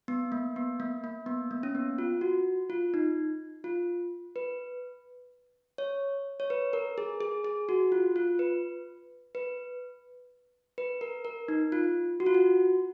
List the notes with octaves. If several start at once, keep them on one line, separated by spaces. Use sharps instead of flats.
B3
A#3
B3
A#3
A#3
B3
A#3
C#4
B3
F4
F#4
F4
D#4
F4
B4
C#5
C#5
B4
A#4
G#4
G#4
G#4
F#4
F4
F4
B4
B4
B4
A#4
A#4
D#4
F4
F#4
F4
F#4